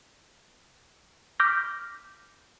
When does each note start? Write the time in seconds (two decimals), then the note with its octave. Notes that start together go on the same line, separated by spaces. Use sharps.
1.39 D6 F6 G6 A#6 B6